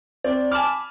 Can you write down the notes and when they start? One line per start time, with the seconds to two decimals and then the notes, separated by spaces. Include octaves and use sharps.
0.24 C4 D5
0.51 G#5 A5 B5 D6 F6